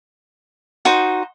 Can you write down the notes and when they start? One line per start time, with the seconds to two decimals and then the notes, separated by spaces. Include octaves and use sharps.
0.85 D#4 F#4 C5